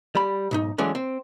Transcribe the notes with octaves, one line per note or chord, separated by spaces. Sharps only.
G3 B5
B1 G#2 D#4
E3 F#3 G#3 A3 C#4 D4
C4